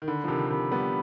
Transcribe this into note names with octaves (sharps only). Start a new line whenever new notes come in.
D#3
D3 B5
F3
C3 D#3
C3 D#3 B5
G3 B3